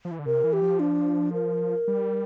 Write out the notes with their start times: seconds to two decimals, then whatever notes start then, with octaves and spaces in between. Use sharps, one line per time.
0.05 F3
0.11 E3
0.19 D3
0.26 C3 A#4
0.44 E3
0.53 G4
0.62 F3
0.80 D4
1.33 A#4
1.88 G3